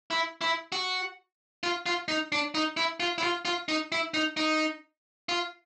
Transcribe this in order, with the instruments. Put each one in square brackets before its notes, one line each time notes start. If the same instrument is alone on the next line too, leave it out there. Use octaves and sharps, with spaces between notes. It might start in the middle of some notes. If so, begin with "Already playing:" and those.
[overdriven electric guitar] E4
E4
F#4
F4
F4
D#4
D4
D#4
E4
F4
E4
F4
F4
D#4
E4
D#4
D#4
F4